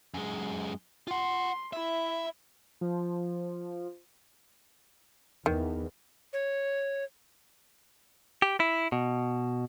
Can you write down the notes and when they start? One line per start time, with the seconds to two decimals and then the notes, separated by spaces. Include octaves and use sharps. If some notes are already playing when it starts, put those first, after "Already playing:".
0.14 F#2 G#3
1.08 F4 F#5 C6
1.73 E4 E5
2.81 F3
5.46 E2 D#3
6.33 C#5
8.42 G4
8.60 E4
8.92 B2